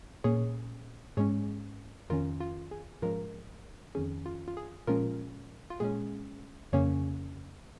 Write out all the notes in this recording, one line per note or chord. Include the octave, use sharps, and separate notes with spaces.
A#2 A#3 C#4 G#4 C#5
G#2 G#3 C#4 G#4 C#5
F2 D#3 C#4 F4 A#4
F4
G#4
G#2 F3 G#3 C#4 F4 A#4
F2 D#3 C#4 G#4
F4
F4
G#4
A#2 F3 G#3 C#4 F4 A#4
F4
A#2 G#3 C#4 G#4
F2 C#3 A#3 C#4 G#4 C#5